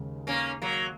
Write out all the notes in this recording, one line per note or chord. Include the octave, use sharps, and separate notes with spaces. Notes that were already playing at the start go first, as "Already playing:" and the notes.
Already playing: D#2 C#3 G#3
A#3 C#4
F#3 A#3